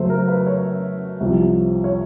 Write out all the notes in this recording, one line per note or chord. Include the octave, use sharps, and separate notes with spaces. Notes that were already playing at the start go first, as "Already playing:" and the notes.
Already playing: F#2 C#3 F#3 A3 C5
A#4
B4
C#5
C2 C3 F3
C#5